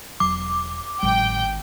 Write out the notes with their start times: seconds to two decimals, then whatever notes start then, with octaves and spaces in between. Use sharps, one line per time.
0.20 E1 F#3 D6
1.03 G#1 A2 F#3 G#3 G5